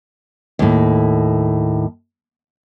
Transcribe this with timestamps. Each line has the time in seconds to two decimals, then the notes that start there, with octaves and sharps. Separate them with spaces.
0.59 D#2 A2